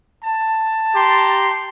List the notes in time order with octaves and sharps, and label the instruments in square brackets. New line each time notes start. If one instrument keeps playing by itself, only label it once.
[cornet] A5
[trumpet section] G4 A#5 C6